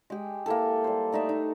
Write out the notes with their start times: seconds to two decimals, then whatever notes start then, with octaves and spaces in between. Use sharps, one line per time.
0.10 G#3 G4
0.46 A#3 E4 A4
0.84 G3 C5
1.12 A3 D#4 D5 E5
1.29 D#4